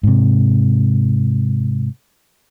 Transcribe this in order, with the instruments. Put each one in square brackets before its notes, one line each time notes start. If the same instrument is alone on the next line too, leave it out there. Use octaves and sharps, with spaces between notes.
[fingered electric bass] G#2 C3